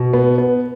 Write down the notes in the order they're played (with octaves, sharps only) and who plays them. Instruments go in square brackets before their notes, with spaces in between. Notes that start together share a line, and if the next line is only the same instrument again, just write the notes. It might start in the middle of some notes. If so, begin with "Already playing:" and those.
Already playing: [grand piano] B2
B3
B3